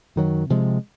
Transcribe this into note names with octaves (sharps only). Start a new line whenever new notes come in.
F#2 D#3 F#3
C3 F3 G#3